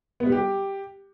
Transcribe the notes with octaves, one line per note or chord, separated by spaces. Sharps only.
B3
G3
G4